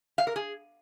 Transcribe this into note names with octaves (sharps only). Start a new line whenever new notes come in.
F5
A#4
G#4